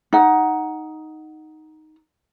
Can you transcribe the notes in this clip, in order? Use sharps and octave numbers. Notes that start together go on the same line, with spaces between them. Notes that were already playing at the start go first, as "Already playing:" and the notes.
D#4 F#5